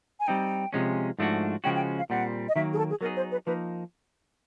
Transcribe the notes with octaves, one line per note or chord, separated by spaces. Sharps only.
G#5
G3 C4 D#4 G5
C3 F3 G#3 C#4
G#2 F3 A3 D4 F#4
C#3 F3 G#3 C#4 F#4 G5
G5
F5
A#2 G3 C4 F#5
D#5
D#3 F#3 A#3 E5
G#4
A4
G#4
F#3 B3 D#4 G#4 A#4
C5
B4
F3 A#3 D#4 B4